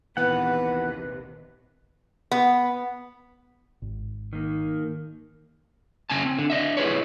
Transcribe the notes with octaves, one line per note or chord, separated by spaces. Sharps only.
A#1 D#2 C3 E3 B3 B4 F#5
B3
G#1
D#3 A#3
C#3 C#4 G#5 A5
C4
D3
D4 D#5 E5
E4 G#4 B4 C#5